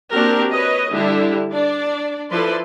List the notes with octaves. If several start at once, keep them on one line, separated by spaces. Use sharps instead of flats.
A#3 C4 D4 F#4 G4 A#4
B4 C#5 D#5
D3 G3 D4 E4 G4
D4 D5
F3 E4 A4 B4 D5 C6